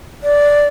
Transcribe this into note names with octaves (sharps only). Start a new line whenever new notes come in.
D5